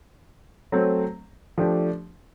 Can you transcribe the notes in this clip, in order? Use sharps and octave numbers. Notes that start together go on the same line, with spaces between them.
F#3 A3 C4
F3 A3 D4 G4